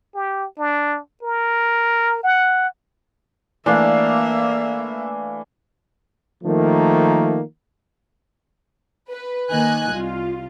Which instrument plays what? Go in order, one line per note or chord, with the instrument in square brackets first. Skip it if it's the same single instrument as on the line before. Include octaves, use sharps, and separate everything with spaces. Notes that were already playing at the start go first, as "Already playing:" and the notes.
[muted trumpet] G4
D4
A#4
F#5
[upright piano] E3 A3 F5 [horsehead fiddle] A#3 E5 [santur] D4 D5
[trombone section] D#3 F3 A3 A#3
[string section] B4
D#3 A#3 D#5 G#5 F#6
C2 F4